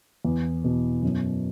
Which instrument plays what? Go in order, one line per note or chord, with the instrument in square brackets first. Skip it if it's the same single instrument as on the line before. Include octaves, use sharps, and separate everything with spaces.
[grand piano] E2
B2
F#2